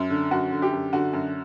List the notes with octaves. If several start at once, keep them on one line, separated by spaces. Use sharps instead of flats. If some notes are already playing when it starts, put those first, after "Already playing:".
Already playing: F#2
D3
F#2 F#4
D3
G4
F#2
D3 F#4
F#2